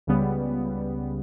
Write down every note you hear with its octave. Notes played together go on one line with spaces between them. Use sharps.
C#2 C#3 G3 B3